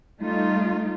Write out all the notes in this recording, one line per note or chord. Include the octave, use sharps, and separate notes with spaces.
G3 A3 D#4 F4